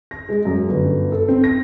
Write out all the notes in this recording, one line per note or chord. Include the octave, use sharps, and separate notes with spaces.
A#6
G#3
F#2
G1
A4
C4
A#6